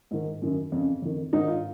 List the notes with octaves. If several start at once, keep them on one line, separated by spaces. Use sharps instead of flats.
G#2 D#3
F#2 D#3
F2 C#3
F2 D#3
G#2 D#3 D#4
F4